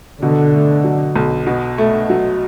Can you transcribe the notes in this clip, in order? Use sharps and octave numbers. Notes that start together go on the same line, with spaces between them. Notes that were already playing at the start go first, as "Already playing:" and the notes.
B2 D3
A3
F#3
B1
B2
A3
F#3